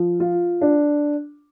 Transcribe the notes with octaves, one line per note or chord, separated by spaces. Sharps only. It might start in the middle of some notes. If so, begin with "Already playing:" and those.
Already playing: F3
F4
D4